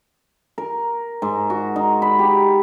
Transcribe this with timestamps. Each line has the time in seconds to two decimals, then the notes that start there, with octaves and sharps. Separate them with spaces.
0.58 A#4
1.22 G#2
1.50 F#4
1.76 D#4
2.02 B5
2.19 G4